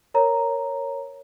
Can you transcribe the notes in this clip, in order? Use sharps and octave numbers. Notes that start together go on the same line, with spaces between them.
A#4 C#5 A#5